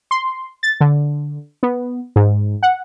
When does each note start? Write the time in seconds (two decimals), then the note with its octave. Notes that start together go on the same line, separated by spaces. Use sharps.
0.11 C6
0.63 A6
0.81 D3
1.63 B3
2.16 G#2
2.63 F#5